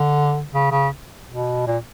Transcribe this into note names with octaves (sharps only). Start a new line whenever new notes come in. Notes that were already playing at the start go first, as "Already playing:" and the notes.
Already playing: D3
C#3
C#3
B2
A#2